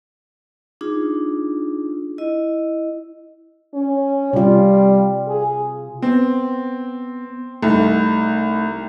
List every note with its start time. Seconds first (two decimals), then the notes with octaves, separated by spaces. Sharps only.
0.81 D4 D#4 F4 G#4
2.18 E4 D#5
3.74 C#4
4.33 C3 G3 F4
5.28 G#4
6.02 B3 C4
7.63 C2 A3 D#4